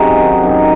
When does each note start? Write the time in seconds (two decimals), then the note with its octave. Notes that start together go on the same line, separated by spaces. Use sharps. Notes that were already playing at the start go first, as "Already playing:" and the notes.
Already playing: F#2 C3 D#4 F#4 G#4
0.18 D#3
0.43 F#2